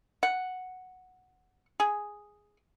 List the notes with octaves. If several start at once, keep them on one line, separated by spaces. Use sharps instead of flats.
F#5
G#4